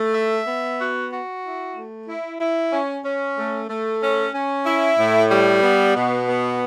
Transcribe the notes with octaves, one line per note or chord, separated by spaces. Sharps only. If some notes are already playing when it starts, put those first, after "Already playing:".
Already playing: A3
E5
B3
F#4
F#4
E4
A3
E4
E4
C#4
C#4
A3
A3
C#4
C#4
E4
A2
G3
B3
B2
B3